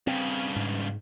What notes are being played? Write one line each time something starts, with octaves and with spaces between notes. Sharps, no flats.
G2 C#3 C4
G#2